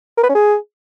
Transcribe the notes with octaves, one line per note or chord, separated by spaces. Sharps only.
A#4
B4
C#4
G#4